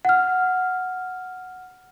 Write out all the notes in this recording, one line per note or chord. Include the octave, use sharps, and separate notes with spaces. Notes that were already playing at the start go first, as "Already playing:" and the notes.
F#5 F6